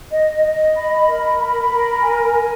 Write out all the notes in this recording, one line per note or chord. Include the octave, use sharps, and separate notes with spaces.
D#5
D#5
B5
A#4
B5
A#4
G#5
G#5